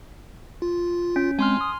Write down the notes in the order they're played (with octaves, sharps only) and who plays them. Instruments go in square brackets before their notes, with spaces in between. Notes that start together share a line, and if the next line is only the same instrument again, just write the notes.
[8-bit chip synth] F4
[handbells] C#4
[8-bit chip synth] G#3 C4 [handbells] G#5 C6 F6
[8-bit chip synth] D#6